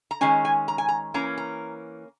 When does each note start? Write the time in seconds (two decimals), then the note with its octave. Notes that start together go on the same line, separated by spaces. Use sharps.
0.11 A#5
0.21 D#3 G#3 C#4 G#5
0.45 G#5
0.68 A#5
0.78 G#5
0.88 A#5
1.14 E3 A#3 C#4 A#5
1.38 A#5